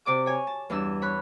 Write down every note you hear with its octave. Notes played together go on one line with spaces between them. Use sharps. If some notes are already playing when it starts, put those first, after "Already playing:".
C3 D5 D6 D#6
C#5 G#5
A5
E2 G2 D4 E6
C#5 B5 C#6 F#6